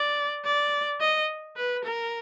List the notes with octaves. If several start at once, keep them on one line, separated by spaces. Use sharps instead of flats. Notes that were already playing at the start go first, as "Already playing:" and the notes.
Already playing: D5
D5
D#5
B4
A#4